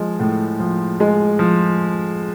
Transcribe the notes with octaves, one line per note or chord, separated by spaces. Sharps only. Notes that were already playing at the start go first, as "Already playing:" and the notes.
Already playing: F3 G#3
A2
F3
G#3
F3